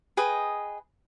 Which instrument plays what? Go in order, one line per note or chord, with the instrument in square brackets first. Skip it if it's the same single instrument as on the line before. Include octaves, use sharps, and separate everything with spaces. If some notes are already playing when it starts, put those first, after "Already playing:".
[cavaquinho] G#4 B4 D#5 G5